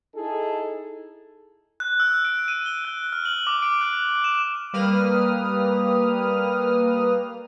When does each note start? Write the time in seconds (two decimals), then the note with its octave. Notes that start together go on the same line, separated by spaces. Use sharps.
0.15 D#4 E4 G#4 A4
1.80 F#6
2.00 E6
2.25 D7
2.48 D#7
2.66 G7
2.85 F#6
3.13 F6
3.25 F#7
3.47 D6
3.62 D7
3.81 F#6
4.24 E7
4.73 G3 A#3 B4 D#6 F6